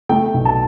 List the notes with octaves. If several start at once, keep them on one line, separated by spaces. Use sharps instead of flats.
A3 G5
B1
A5